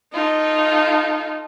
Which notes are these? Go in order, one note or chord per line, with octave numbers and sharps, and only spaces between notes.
D#4 F4 A4